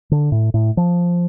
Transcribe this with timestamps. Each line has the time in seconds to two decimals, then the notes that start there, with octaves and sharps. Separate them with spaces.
0.11 D3
0.32 A2
0.54 A2
0.77 F3